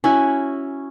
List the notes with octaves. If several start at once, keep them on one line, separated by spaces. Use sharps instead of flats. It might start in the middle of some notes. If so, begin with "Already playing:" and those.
C#4 E4 F#4